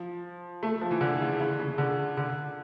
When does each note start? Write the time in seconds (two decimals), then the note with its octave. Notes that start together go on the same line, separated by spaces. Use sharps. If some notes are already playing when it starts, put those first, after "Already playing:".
Already playing: F3
0.63 A3
0.81 F3
0.91 E3
1.01 D3
1.20 C#3
1.40 C#3
1.59 C#3
1.78 D3
2.17 D3